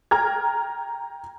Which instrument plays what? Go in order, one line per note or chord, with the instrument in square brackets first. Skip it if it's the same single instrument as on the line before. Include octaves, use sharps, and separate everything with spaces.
[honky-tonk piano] G5 A#5 F6 G#6